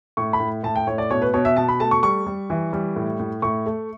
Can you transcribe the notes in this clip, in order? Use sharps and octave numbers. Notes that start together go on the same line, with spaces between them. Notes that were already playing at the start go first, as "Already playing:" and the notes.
A2 C#6
B5
A2
A2 A5
G5
A2 C#5
D5
B2 C#5
B4
B2 C#5
E5
B2 A5
B5
A3 A5
C#6
G3 C#6
G3
E3
G3
A2
A2
A2 C#6
A3